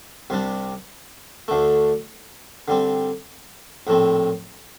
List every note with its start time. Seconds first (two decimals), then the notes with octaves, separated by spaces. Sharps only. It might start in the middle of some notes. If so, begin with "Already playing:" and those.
0.30 C2 C3 G3 D4
1.48 D2 D3 A3
2.68 D3 G3 C4
3.87 A#1 A2 A3 C4